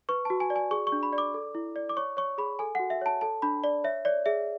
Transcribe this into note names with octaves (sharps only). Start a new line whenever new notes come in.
B4 C#6
F#4 A5
G#5
D5
G#5
G#4 C#6
C#6
D4
B5
D5
D6
A4
E4
D5
D6
C#5 C#6
C#5 C#6
G#4 B5
A4 G#5
F#4 F#5
E5
C#5 A5
A4 A5
D4 B5
D5
C#5 E5
C#5 D5
G#4 E5